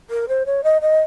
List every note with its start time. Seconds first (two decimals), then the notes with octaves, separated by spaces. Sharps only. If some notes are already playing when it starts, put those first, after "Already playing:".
0.10 A#4
0.29 C5
0.46 C#5
0.64 D#5
0.82 D#5